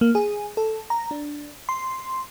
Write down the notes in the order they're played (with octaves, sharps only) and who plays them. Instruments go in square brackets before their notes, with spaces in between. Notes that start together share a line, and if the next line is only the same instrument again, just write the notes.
[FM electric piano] A#3
G#4
A4
A#5
D4
C6